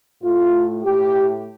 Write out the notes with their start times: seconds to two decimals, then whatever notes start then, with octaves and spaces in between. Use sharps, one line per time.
0.22 A2 A3 F4
0.84 A2 A3 G4